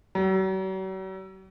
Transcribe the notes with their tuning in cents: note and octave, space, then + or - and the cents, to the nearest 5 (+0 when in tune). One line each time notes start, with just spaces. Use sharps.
F#3 +45